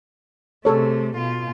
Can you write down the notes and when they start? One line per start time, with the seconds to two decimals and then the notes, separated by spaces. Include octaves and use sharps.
0.65 C3 A3 G#4 A4 C#5
1.17 B2 F4